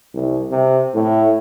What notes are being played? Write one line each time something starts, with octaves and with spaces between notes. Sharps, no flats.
C2
C3
A2